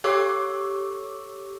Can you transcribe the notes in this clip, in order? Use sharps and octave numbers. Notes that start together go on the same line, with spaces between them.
G4 A4 C#5 C#6 D6 E6